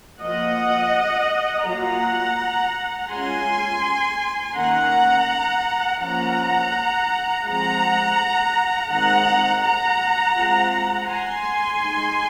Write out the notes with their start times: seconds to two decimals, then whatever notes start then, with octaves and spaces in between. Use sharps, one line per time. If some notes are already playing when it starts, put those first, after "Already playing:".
0.20 F3 A#3 F4 D#5 F#5
1.66 F#3 A#3 F4 F#5 A#5
3.11 G#3 C#4 F4 G#5 C6
4.55 D#3 A#3 C#4 F#5 A#5
6.00 F3 A#3 C#4 F4 F#5 A#5
7.45 F3 G#3 C4 F#5 A#5
8.90 D#3 G#3 C4 D#4 F#5 A#5
9.62 F#5 A#5
10.35 G#3 C4 F4
11.07 G#5 C6
11.79 G#3 D#4